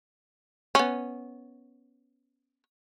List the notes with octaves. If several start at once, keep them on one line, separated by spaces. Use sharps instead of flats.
B3 C#4